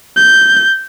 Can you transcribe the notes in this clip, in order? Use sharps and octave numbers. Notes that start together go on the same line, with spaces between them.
G6